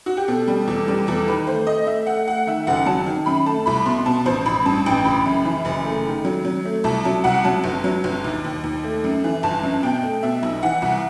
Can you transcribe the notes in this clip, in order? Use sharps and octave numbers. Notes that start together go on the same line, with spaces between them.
F#4
G4
B2 A4
G3
E2 A4
G3
E2 A4
D#3 B4
A3 C5
A3 D#5
A3 E5
A3 F#5
A3 F#5
D#3 E5
F#1 F#5
F#3 A5
D#3
F#2 B5
A3 A5
C2 B5
B2 C6
B2 A5
A1 C5
A1 B5
G2 A5
A1 G5
F#1 B5
F#2
E3
F#1
A3
D#3
F#3
F#3
A3
C2 A5
F#3 A5
C2 F#5
F#3 A5
G1
F#3
G1
D#2
D#2
D#2
A3
F#2
E3
G1 A5
F#2
B2 G5
A3
B2 E5
B1
E3 F#5
C2